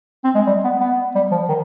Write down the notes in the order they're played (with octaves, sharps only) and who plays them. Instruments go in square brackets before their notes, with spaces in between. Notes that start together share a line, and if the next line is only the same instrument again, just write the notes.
[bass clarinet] C4
G#3
G3
B3
B3
G3
F3
D#3